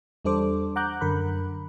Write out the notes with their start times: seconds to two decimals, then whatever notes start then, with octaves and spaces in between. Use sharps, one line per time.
0.25 E2 G3 D4 A4 C5 D6
0.76 F#5 A#5 D6 F#6 G6
1.01 F#2 D3 A#4 B5 F#6